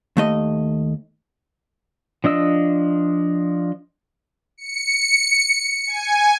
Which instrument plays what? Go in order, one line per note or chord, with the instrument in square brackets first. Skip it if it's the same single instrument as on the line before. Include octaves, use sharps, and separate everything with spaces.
[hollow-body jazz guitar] D#2 A3 D#5
[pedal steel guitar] F3 D4 D#5 E6
[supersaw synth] C#7
G#5